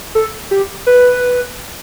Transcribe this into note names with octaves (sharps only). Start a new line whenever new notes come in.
A4
G4
B4